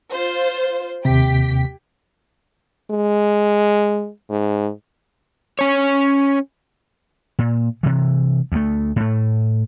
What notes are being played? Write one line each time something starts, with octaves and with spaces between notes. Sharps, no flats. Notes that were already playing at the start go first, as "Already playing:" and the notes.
F4 C5
D#2 C3 G4 G5 B6
G#3
G#2
C#4 C#5
A#2
C3 E3
D2 A3
A2 A3